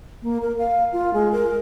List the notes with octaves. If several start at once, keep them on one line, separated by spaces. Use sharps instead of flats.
A#3
A#4
F5
F4
G#3
A#4